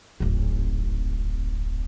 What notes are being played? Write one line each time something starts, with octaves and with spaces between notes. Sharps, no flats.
D1 G#1